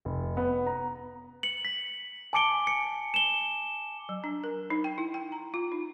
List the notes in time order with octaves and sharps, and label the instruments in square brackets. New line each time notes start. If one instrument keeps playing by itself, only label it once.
[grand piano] F1
B3
A#5
[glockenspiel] C#7 F#7
B6
G#5 A5 D6 C#7 D7 G7
C#7
E7 G7
[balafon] F#3
D4
A#4
D#4
G5
E4
G5
A#5
F4
D#4